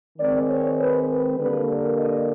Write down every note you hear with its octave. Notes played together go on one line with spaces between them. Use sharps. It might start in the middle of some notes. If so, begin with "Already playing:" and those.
D#3 G#3 C4 D5
C#5
B4
B4
D3 G3 A#3 B4
A#4
D#5